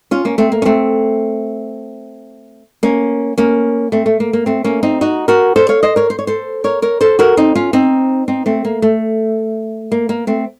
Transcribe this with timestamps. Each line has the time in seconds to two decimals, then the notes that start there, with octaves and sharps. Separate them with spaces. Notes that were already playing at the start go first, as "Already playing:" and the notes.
0.11 C#4 F4
0.25 A#3 C#4
0.38 A3 C4
0.52 A#3
0.62 C#4
0.65 A3 C4
2.83 A#3 C#4
3.38 A#3 C#4
3.92 A3 C4
4.06 A3
4.20 A#3
4.33 A#3
4.46 A3 C4
4.64 A#3 C#4
4.83 C4 D#4
5.01 D#4 F#4
5.28 F#4 A#4
5.56 A4 C5
5.69 C#5 F5
5.83 C5 D#5
5.96 A#4 C#5
6.10 C5
6.19 C#5
6.27 A4 C5
6.64 A#4 C#5
6.82 A#4 C#5
7.01 A4 C5
7.19 F#4 A#4
7.37 C4 D#4
7.55 C#4 F4
7.73 C4 D#4
8.28 C4 D#4
8.46 A3 C4
8.65 A#3
8.82 A3
9.92 A#3
10.09 A#3
10.27 A3 C4